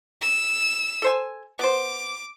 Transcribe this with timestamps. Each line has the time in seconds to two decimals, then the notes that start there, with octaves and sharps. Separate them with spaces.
0.21 E6
1.02 A4 C5 G#5
1.59 B3 C5 D6